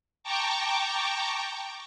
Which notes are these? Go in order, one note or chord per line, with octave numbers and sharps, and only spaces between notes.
G5 A5 A#5 C#6 D6